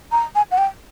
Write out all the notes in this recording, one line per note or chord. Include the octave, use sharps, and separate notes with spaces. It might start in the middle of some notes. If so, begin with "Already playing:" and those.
A#5
G#5
F#5
G5